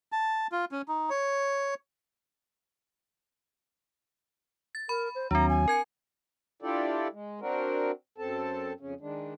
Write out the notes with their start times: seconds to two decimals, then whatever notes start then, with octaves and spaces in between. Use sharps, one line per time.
0.12 A5
0.52 F4
0.72 C#4
0.88 D#4
1.10 C#5
4.75 A6
4.89 A#4 B5
5.15 C5
5.31 D#2 F#3 C4 D4 A#5
5.49 G#5
5.68 A#4 G#6 C#7
6.62 D4 E4 F4 G4 A4 D5
7.13 G#3
7.41 C4 D4 F#4 A#4
8.18 F#2 C4 A4 A5
8.80 F2 C#3 C#4
9.01 D#3 G#3 D4